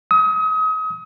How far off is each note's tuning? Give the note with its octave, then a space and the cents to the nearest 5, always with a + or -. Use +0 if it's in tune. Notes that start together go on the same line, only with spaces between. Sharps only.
D#6 +35